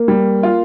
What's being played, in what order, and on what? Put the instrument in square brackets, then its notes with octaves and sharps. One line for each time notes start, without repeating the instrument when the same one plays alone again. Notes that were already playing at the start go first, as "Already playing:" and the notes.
Already playing: [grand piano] A#3
[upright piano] G3
F4